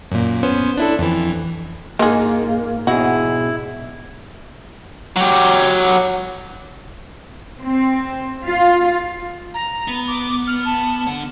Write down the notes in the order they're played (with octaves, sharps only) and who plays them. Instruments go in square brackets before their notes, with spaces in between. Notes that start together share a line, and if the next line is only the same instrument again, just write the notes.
[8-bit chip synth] F#2 A#2
B3 C#4 C5
D4 E4 A4
F2 E3
[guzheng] G#2 F4 [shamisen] G#3 G#4 [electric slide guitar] A#3
[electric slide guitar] B2 G#4 [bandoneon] E4 [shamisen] F#4
[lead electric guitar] F#3 G4
[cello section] C4
F4
[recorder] A#5
[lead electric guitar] B3
[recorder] D6
F6
A5
[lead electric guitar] D3 F#5